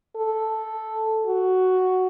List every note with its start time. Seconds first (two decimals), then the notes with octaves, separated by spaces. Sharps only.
0.16 A4
1.26 F#4